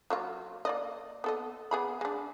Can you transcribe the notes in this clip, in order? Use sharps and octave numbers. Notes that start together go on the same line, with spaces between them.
F#3 A#3 F4
A#3 D5 D#5
B3 A4 D#5
B3 G#4 B5
G#3 D4